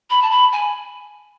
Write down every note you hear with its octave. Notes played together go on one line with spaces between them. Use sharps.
B5
A5
B5
G#5